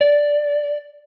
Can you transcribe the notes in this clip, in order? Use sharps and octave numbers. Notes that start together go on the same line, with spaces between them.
D5